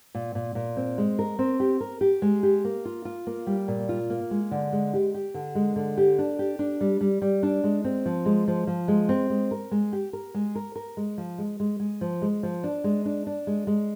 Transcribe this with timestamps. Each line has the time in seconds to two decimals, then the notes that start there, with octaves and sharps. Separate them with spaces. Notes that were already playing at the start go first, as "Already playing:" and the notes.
0.15 A#2
0.35 A#2
0.55 A#2
0.77 C4
0.98 G#3
1.19 A#4
1.39 C4
1.60 G4
1.80 A#4
2.01 G4
2.22 G#3
2.43 G4
2.64 A#3
2.85 F4
3.05 F4
3.27 A#3
3.47 G3
3.68 A#2
3.89 F4
4.10 A#3
4.31 G#3
4.51 D3
4.72 G#3
4.94 G4
5.14 G4
5.34 D3
5.55 G#3
5.76 D3
5.97 G4
6.19 D4
6.39 G4
6.59 D4
6.81 G3
7.01 G3
7.22 G3
7.43 D4
7.64 G#3
7.84 C4
8.06 F3
8.26 G#3
8.48 F3
8.67 F3
8.88 G#3
9.09 C4
9.30 G#3
9.51 A#4
9.71 G#3
9.93 G4
10.13 A#4
10.34 G#3
10.55 A#4
10.76 A#4
10.97 G#3
11.18 F3
11.38 G#3
11.60 G#3
11.80 G#3
12.01 F3
12.22 G#3
12.43 F3
12.64 D4
12.84 G#3
13.05 D4
13.27 D4
13.47 G#3
13.67 G#3